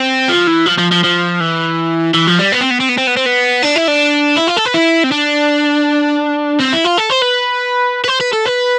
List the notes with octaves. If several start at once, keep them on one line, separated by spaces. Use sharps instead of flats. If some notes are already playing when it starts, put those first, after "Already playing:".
Already playing: C4
F3
E3
F3
F3
F3
F3
E3
E3
F3
G3
B3
C4
B3
C4
B3
C4
B3
C4
B3
D4
E4
D4
E4
F4
A4
B4
E4
C4
D4
C4
E4
F4
A4
C5
B4
B4
C5
B4
A4
B4